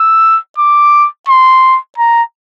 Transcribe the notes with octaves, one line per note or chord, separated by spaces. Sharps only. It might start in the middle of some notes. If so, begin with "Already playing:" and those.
Already playing: E6
D6
C6
A#5